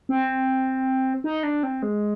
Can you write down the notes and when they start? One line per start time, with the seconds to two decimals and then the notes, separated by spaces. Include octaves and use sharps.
0.09 C4
1.24 D#4
1.43 D4
1.63 C4
1.82 G#3